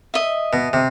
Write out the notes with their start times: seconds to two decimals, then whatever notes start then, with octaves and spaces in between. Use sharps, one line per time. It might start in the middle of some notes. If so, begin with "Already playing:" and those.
0.14 D#5 E5
0.53 B2
0.73 C3